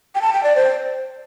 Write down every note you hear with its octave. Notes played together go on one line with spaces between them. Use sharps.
G5
A5
G5
D5
C5